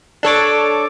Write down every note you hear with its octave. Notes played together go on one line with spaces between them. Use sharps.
D4 A4 C#5 D6